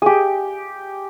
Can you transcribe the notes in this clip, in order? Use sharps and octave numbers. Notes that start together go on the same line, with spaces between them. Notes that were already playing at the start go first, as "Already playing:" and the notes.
G4 G#4